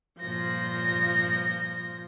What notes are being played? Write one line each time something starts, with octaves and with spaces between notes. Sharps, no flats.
G2 A#2 F3 G6 A#6